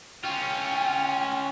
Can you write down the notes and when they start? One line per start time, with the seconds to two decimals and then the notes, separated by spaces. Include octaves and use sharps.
0.24 C#4 F4 G5